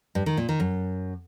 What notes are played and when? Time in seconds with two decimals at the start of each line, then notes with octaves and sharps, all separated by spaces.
0.15 G2
0.26 D#3
0.37 A#2
0.49 D#3
0.60 F#2